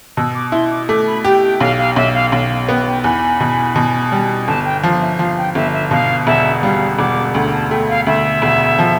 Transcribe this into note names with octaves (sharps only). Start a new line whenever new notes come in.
B2 E6
D6
E4 C6
D6
A3 D6
B5
G4 G5
G5
B1 F5
F5
B1 E5
F5
B1 F5
F5
B3 G5
G5
E2 B5
B2
B2
G3
G1 A5
G5
F3 F5
E5
F3 F5
G5
G1 E5
E5
B2 F5
E1 E5
G3 F5
E1 D6
D2 B5
A5
A3 G5
F5
D2 E5
E1
F3